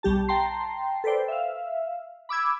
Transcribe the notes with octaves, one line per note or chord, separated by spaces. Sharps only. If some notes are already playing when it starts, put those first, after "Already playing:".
B1 G3 G4 A5
G5 A5 A#5 C6 C7
A4 B4 C5 D5 G5
E5 F5
B5 D6 E6 G#6